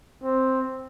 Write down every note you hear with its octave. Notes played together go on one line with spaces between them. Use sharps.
C4